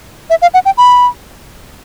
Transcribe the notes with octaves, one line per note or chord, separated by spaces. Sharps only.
E5
F5
F#5
G5
B5